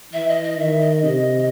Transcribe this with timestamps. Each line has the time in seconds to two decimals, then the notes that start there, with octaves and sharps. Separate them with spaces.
0.13 E3 E5
0.28 D#5
0.44 D#5
0.58 D#3 E5
0.81 D#5
1.03 C3 D#5